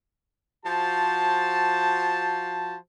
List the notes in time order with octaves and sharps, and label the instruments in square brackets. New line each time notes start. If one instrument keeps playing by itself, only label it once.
[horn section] F3 F#4 C5 A5